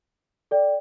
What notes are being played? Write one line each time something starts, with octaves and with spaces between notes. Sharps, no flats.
A4 D5 G5